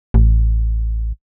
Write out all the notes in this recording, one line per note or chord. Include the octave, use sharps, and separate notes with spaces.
A1